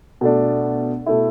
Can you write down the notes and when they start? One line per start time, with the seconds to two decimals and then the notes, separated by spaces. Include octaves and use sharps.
0.21 B2 A3 D4
1.06 B2 A3 E4